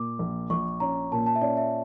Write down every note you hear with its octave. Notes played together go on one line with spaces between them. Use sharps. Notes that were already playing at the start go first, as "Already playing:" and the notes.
Already playing: A#2 D6
A#1
A#1 C#6
C#4 A#5
A#2 A5
A5
E5
C#4 D5
E5